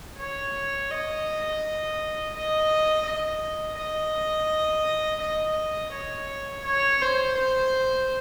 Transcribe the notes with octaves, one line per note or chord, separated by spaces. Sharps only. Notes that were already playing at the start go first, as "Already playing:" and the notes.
C#5
D#5
D#5
D#5
D#5
D#5
C#5
C#5
C5
C5